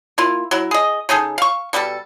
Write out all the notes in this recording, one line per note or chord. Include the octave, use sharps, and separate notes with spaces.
A#3 E4 F4
F#3 E4
G#4 D#5
C#3 D#4 G#4 A4
F5 C#6
B2 G3 E4 A4